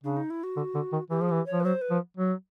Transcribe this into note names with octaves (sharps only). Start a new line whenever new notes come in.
C#3 D4
D#4
E4
F#4
D3
D3
D#3
E3 G4
F3 G#4
E3 G4
C#5
F3
B4
F#3 C5
B4
F3
F#3